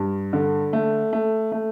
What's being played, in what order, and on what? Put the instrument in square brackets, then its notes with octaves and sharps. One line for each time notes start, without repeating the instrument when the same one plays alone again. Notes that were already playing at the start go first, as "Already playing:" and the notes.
Already playing: [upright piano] G2
D3
A3
A3
A3